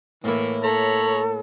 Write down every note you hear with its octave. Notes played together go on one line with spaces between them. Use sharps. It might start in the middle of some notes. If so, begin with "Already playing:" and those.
A2 E3 A#3 E4
A4 C#5 A#5 B5